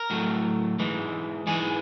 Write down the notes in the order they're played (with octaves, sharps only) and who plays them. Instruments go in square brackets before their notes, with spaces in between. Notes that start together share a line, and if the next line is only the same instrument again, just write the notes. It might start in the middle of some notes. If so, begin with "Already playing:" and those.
Already playing: [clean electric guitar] A#4
A2 F#3 A3
G#2 E3 G#3
G#2 E3 G#3 G#4